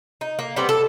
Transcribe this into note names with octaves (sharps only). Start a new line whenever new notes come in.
D#4
A#3
G3 B3 C4 G4
A4